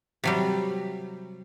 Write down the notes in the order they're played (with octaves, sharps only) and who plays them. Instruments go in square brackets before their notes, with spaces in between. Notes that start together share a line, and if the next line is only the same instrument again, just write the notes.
[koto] C3 F#3 G3